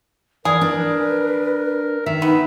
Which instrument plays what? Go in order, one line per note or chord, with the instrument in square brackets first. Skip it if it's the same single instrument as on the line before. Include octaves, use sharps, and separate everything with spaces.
[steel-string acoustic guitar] E3 [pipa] G#4 [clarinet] A#4 [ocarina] D5
[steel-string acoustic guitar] D4 [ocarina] B4
[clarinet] A#4
[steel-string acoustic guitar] D#3 [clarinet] E5
[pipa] B3 [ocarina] D#4